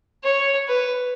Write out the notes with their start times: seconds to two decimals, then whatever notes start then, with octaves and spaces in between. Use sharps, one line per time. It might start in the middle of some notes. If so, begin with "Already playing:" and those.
0.24 C#5
0.68 B4